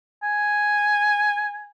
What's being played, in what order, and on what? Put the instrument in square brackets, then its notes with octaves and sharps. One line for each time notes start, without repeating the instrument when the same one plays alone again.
[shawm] G#5